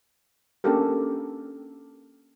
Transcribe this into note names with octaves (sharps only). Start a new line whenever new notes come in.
A#3 C#4 D4 G4 A4 A#4